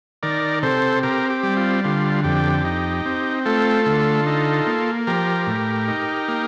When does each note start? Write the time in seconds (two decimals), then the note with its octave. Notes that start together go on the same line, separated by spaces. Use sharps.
0.23 D#3 A#4 D5
0.63 C3 A4 C5
1.03 C4 G4 A#4
1.30 G4
1.43 G3
1.57 F4
1.84 D3 F4
2.24 F2 G4
2.64 D#4
3.05 C4
3.46 A3 F4 A4
3.86 D3
4.26 D#4
4.67 A#3
5.07 F3 G4 A#4
5.47 A2
5.88 D#4
6.28 A#3